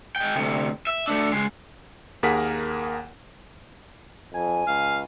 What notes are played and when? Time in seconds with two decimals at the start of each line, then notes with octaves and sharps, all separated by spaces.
0.16 G#3 G5
0.35 D2 C3
0.87 E5
1.08 A3 D4
1.32 C#2 G#3
2.23 D#2 A#3 G#4 A#4 F#5 B6
4.34 F2 G#5
4.67 C#2 F5